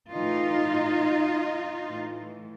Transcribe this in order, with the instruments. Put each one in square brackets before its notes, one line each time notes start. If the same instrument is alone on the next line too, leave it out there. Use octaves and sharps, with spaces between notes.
[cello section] A2 E3 D#4 F4
A2 E3